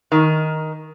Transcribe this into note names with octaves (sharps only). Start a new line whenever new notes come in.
D#3